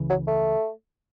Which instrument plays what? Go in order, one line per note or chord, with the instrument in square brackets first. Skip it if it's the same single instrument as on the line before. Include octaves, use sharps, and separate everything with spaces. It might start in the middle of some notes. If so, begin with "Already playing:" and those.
Already playing: [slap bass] C#2 C#3 E3
[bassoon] F#3
A3